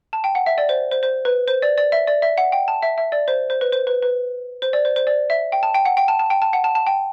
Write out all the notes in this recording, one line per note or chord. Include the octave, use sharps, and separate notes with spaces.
A5
G5
F#5
E5
D5
C5
C5
C5
B4
C5
D5
D5
E5
D5
E5
F#5
G5
A5
E5
E5
D5
C5
C5
B4
C5
B4
B4
C5
D5
C5
C5
D5
E5
G5
A5
G5
F#5
G5
A5
A5
G5
A5
F#5
A5
A5
G5